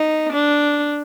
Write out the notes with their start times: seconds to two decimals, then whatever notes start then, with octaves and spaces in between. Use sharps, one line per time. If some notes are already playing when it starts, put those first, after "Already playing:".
Already playing: D#4
0.33 D4